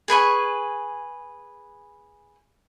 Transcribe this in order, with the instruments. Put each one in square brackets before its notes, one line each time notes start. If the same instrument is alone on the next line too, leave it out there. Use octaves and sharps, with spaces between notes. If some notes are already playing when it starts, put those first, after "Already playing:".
[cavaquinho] G#4 B4 G#5 C#6